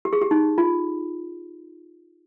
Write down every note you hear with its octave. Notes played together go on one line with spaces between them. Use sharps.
G4
G#4
G4
D#4
F4